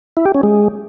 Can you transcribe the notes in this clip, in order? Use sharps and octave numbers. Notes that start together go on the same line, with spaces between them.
E4
G4
C#4
G#3